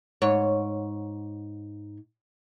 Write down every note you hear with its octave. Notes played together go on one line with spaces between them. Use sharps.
G#2 C#5